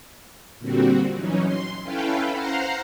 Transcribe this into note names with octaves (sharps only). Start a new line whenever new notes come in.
A#2 D3 G3 C4 F#4
E3 F#3 C#4 D#4
C6
C#4 E4 A4 B4 F5 G5
C5 F5 F#5 A#5 C6